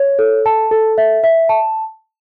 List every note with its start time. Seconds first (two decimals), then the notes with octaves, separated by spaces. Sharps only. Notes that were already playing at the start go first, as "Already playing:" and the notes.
Already playing: C#5
0.19 A4
0.46 A5
0.71 A4
0.98 E5
1.24 E5
1.49 A5